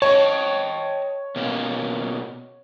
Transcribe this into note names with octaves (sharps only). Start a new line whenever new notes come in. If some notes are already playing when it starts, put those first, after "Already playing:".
C#5 D#5 G5 A5
B2 A#3 C#4